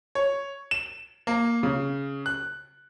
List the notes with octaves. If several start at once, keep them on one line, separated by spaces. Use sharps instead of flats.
C#5
E7
A#3
C#3
F#6